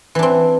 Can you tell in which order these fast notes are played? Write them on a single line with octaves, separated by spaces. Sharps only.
E3 D4 C4